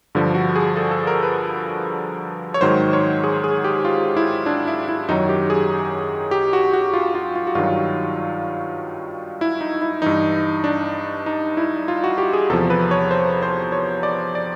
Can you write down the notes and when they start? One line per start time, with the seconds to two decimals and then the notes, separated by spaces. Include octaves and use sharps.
0.15 G2 D3 F3
0.35 F#4
0.56 G#4
0.76 A4
0.91 A4
1.07 A#4
1.23 B4
2.54 C#5
2.61 G#2 D#3 F#3 C5
2.93 C#5
3.24 G#4
3.44 G#4
3.64 G4
3.85 F4
4.17 E4
4.46 D4
4.67 E4
4.89 E4
5.09 F#2 D#3 F#3 D#4
5.29 G4
5.50 G#4
6.31 G4
6.53 F#4
6.73 F#4
6.94 F4
7.15 F4
7.35 F4
7.47 F#4
7.55 G2 D#3 F#3 F4
9.41 E4
9.61 D#4
9.82 E4
10.02 G2 E3 D#4
10.64 D4
11.26 D#4
11.57 E4
11.88 F4
12.04 F#4
12.18 G4
12.33 G#4
12.50 E2 C3 F3 A4
12.70 B4
12.91 C#5
13.11 C5
13.43 C5
13.72 C#5
14.03 D5
14.35 D5